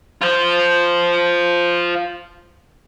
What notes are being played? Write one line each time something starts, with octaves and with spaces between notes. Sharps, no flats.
F4 C5